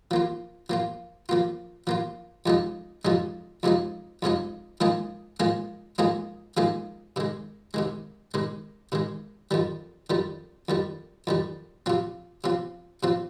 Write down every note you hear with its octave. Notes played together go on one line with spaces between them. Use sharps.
F3 A#3 F4
F3 A#3 F4
F3 A#3 F4
F3 A#3 F4
F2 C3 F3 G#3 D#4
F2 C3 F3 G#3 D#4
F2 C3 F3 G#3 D#4
F2 C3 F3 G#3 D#4
G#2 F3 A#3 D#4 G#4
G#2 F3 A#3 D#4 G#4
G#2 F3 A#3 D#4 G#4
G#2 F3 A#3 D#4 G#4
C3 D#3 G#3
C3 D#3 G#3
C3 D#3 G#3
C3 D#3 G#3
F2 D#3 G3
F2 D#3 G3
F2 D#3 G3
F2 D#3 G3
C3 F3 C4
C3 F3 C4
C3 F3 C4